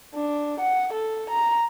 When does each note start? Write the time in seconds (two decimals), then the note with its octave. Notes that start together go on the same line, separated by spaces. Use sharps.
0.15 D4
0.61 F#5
0.94 A4
1.30 A#5